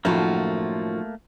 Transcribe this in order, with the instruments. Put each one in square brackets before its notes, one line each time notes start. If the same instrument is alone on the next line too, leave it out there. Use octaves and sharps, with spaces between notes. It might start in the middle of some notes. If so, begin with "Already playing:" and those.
[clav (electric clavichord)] F#2 A2 D#3 [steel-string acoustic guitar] F3 F4 F#4 [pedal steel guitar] A3 A#3